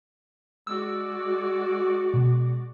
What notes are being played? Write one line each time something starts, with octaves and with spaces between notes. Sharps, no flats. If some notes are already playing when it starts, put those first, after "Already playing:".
G#3 F#4 D5 E6
B2